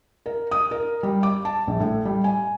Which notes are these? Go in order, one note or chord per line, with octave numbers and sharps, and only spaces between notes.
A#4
D#6
A#4
G3
D6
A5
A#1
A2
G3
G#5